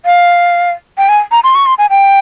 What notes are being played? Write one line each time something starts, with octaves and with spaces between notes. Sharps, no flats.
F5
G5
G#5
A#5
C6
C#6
C6
G#5
G5